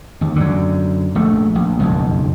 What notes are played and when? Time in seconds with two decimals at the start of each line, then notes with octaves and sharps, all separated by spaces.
0.21 D#2
0.36 F#2 D3
1.15 A#1 A3
1.55 A#1
1.79 F#1 B1 F2